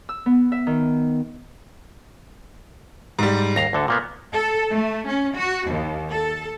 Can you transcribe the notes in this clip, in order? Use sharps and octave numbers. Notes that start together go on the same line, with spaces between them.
E6
B3
E5
D#3
G#2 G3
D#2 A#5 A#6 C7
D2 D3 A4
A#2 A#3 B3
A4
A3
C#4
F#4
D#2
A4